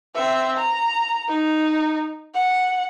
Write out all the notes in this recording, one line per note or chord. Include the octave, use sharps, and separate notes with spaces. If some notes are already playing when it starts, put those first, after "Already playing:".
C4 E5
A#5
D#4
F#5